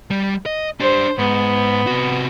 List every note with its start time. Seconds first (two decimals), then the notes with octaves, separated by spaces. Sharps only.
0.11 G3
0.46 D#5
0.80 D4 G4 C5
1.18 G#2 B3
1.87 C3 F#4